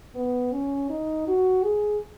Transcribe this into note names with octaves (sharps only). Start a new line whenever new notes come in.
B3
C#4
D#4
F#4
G#4